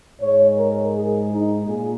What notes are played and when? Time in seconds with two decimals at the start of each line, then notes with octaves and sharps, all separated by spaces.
0.20 G#2 G#3 C#5
0.57 A#4
0.94 G#4
1.29 D#4
1.65 A#2 A#3 G#4